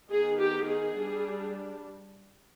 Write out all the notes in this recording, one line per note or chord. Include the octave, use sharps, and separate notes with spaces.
D#3 B3 D#4 G#4
G4
G#4
G3 D4